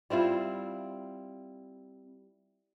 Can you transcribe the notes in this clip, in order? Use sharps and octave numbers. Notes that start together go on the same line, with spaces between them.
G3 C4 E4 F4